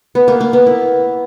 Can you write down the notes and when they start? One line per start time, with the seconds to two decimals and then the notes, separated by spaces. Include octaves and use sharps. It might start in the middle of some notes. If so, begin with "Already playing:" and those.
0.15 B3
0.28 A#3
0.41 A#3
0.53 B3
0.66 E4